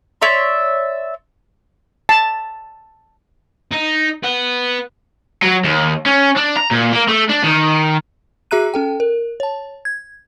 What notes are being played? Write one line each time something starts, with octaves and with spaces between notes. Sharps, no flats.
C#5 D5 E5 C6
A5
D#4
B4 F#5
F#3
D#2
C#4
D4
A#5
A#2
A#3
A3
D4
D#3
F#4 G#4 E5 A#5 F#6 D#7
C#4 A4 G5
A#4
C#5 A5
G#6